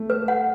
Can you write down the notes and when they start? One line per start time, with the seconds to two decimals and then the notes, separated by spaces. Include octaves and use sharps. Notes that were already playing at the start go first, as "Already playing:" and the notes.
Already playing: A3
0.10 B4
0.28 F#5